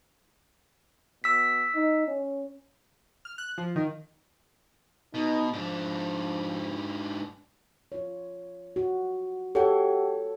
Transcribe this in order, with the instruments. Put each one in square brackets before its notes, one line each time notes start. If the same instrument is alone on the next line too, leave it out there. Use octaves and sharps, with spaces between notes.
[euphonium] B2 [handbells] E6 B6
[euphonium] D#4
C#4
[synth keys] F6
F#6
F3
D#3
[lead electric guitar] B2 [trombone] D#4
[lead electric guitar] G#2 D4 [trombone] F3
[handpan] F4 C#5
F#4
[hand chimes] G4 F#5 G5 [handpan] A4 C#5